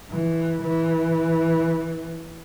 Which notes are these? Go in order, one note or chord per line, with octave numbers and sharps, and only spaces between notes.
E3
E3